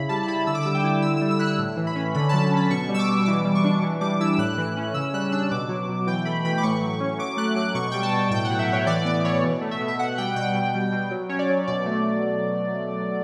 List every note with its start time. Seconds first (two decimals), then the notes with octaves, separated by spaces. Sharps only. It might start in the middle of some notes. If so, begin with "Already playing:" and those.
Already playing: C#3 E4 B5
0.09 G3 A5
0.23 A5
0.28 E4 B5
0.47 D3 E6
0.55 D6
0.62 G3 E6
0.75 G5
0.84 E4
1.02 D3 E6
1.17 G3 E6
1.31 E6
1.39 E4 F#6
1.45 E6
1.58 A2
1.77 E3
1.87 B5
1.95 C#4
2.15 D3 B5
2.29 A5
2.33 F#3
2.42 A5
2.53 C#4 B5
2.70 B2 C#6
2.89 G3
2.94 E6
2.99 D6
3.08 B2
3.26 E3 D6
3.45 G3
3.55 C#6
3.64 D4
3.83 E3
4.01 G3 D6
4.20 E4 E6
4.38 A2 F#6
4.58 E3
4.77 C#4
4.94 C#3 E6
5.13 G3 F#6
5.32 D4 E6
5.51 B2 D6
5.69 F#3
5.89 B2
6.07 E3 G5
6.25 A3 B5
6.45 E3 B5
6.58 D6
6.63 A2 C#6
6.81 F#3
7.00 C#4
7.18 F#3 D6
7.37 A3 F#6
7.56 F#3 D6
7.75 B2 C#6
7.91 G3 G5
8.03 A5
8.13 B2
8.31 A2 G5
8.44 F#5
8.50 F#3
8.59 E5
8.69 A2 C#5
8.86 E3 D5
9.05 B3 D5
9.24 E3 C#5
9.43 B2
9.61 A3
9.71 E5
9.81 B2
9.88 E5
9.99 B2 F#5
10.18 G3 G5
10.36 B2 G5
10.55 B2
10.74 G3
10.92 B2
11.11 F#3
11.29 C#4 C#5
11.39 D5
11.49 F#3
11.68 B2 D5
11.86 A3